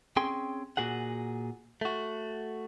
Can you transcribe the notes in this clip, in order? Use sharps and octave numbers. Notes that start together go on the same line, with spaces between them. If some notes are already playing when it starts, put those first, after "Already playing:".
C4 C#4 G#4 G5 C6
A#2 F#4 G#4 F#5
A3 F#4